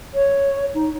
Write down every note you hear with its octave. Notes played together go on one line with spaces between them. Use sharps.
C#5
D#4